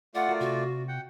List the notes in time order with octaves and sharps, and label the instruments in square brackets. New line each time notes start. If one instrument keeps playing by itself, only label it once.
[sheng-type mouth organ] A3 F4 D5 [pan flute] F#5
[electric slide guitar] F#4 A#4
[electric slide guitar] C3 [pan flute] F#4
[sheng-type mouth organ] F#5 G5